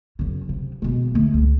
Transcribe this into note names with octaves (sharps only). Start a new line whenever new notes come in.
F#2 C#3
C3
B2 G#3
D3 A3
C#2